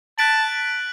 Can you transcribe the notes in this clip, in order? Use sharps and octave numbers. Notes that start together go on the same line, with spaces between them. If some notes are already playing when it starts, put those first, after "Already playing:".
A5 F#6 B6 D7 F#7